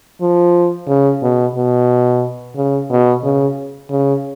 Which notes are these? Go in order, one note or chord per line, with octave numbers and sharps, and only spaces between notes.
F3
C#3
B2
B2
C#3
B2
C#3
C#3